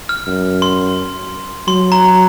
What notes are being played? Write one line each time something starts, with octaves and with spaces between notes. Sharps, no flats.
F6
F#2
C6
F#3 C6
A#5